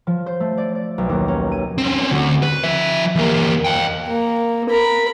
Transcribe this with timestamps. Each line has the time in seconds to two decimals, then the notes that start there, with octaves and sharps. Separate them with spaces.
0.07 F3
0.26 C5
0.40 A3
0.58 D5
0.75 D5
0.98 B1
1.09 D#2
1.28 C#4
1.52 D#7
1.78 C4 C#4
2.10 D2
2.43 B4
2.63 F3 E5
3.16 E2 A#3
3.65 F5 G5
4.07 A#3
4.69 A#4 B5